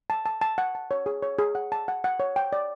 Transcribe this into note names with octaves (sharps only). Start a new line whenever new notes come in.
A5
A5
A5
F#5
A5
C#5
G#4
C#5
G#4
F#5
A5
F#5
F#5
C#5
G5
D5